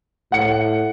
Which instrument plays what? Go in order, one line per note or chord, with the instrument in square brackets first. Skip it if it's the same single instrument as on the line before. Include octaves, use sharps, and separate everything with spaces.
[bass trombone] A2 [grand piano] F#5 C#7